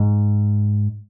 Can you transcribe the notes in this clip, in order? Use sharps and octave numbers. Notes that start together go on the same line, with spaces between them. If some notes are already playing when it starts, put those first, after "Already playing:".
Already playing: G#2